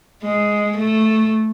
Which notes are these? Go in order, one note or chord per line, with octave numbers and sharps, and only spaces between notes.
G#3
A3